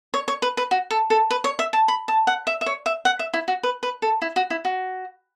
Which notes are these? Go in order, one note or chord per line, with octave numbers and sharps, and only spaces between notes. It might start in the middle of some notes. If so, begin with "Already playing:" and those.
C#5
C#5
B4
B4
F#4
A4
A4
B4
C#5
E5
A5
B5
A5
F#5
E5
E5
C#5
E5
F#5
E5
E4
F#4
B4
B4
A4
E4
F#4
E4
F#4